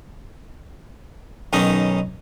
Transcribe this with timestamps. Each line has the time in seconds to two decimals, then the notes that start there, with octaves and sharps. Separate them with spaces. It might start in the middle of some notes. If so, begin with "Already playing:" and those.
1.53 B1 D#3 C#4 D#4